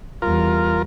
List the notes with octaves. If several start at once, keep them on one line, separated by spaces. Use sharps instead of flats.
E2 G3 F4 A#4